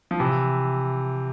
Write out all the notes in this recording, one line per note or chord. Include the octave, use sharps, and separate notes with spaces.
F3
C3 E3